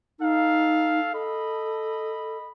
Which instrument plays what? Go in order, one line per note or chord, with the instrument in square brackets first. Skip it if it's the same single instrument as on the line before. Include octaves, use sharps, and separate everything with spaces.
[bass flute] D#4 [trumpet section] A4 F5
[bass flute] A4 [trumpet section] D#5 B5